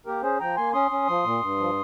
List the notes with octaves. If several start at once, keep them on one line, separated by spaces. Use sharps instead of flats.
A#3 G4 A#4
C#4 G#4 C5
F3 G5 A#5
A#3 G#5 C6
C#4 C6 D#6
C#4
F3
A#2
G2
F3